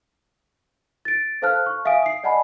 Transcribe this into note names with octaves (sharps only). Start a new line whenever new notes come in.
A6 D7
A4 C5 F5 A5 F6 F#6
C#6
E5 F5 G#5 D#6 D7
D#6 C7
D5 D#5 F#5 G#5 A5 B5